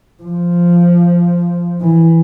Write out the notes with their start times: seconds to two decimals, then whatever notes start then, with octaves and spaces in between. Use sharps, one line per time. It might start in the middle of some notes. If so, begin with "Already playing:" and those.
0.24 F3
1.81 E3